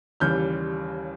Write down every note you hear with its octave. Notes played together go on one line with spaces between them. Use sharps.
D#2 C#3 E3 G3 F6 G6